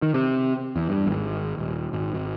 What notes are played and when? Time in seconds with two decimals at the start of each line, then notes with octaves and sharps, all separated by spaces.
0.02 D#3
0.14 C3
0.76 E2
0.89 G2
1.07 G#1
1.58 D#1
1.93 G#1
2.14 G#1